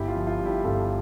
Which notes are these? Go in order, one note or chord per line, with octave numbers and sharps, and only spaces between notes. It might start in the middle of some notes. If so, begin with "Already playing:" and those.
Already playing: G1 E4 G4
F4
F3
F4
G2
E4 G4
G1 F4 A4